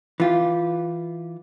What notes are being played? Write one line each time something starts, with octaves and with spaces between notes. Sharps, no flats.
E3 F4 G4